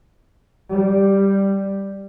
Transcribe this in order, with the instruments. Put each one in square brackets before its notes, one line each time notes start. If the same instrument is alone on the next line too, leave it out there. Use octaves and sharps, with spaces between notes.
[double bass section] G3